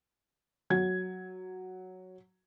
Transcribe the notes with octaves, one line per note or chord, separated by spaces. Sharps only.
F#3 G#6